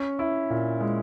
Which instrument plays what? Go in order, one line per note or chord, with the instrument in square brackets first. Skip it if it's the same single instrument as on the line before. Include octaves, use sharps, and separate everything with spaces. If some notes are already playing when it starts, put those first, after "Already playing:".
Already playing: [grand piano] C#4
E4
A#2
G#3